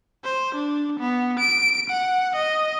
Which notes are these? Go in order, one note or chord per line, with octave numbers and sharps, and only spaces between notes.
C5
D4
B3
D7
F#5
D#5